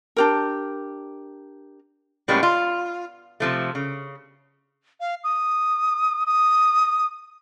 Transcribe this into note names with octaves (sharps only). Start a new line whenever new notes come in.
D4 G4 A#4
A2 G3 G#3 A#3 B3 C#4
F4
C3 F3 A3
C#3
F5
D#6
D#6